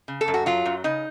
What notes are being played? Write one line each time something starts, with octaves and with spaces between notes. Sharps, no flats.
C#3
A4
F#2
F#4
F#3 F4
F#2
C#3 D#4